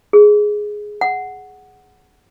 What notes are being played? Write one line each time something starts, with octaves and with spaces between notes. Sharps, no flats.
G#4
F#5